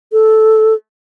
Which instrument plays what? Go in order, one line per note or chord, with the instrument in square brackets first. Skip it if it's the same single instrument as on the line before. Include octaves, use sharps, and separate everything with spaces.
[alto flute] A4